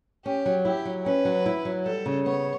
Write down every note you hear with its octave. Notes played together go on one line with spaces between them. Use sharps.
C#4 G4
F#3
E4 G4
F#3
C#4 B4
F#3
E4
F#3
G3 A4
C#3
B3 C#5